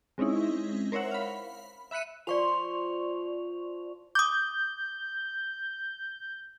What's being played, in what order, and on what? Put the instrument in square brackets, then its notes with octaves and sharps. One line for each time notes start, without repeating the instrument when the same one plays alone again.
[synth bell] G#3 C4 C#4 D#4 E4
A#4 C5 C#5 E5 F#5
F5 B5
E5 B5 F#6 C#7 D#7
[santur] F3 C5 C6 [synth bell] D5 C#6 F7
[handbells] D6 D#6 [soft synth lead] G6